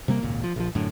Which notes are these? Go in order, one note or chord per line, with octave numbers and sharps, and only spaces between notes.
C3 G3 A#3
G#1 C#2 A#2
F3
A#1 F3
F#2 A2 D3